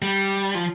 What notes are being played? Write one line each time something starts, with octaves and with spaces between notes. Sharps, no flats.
G3
F3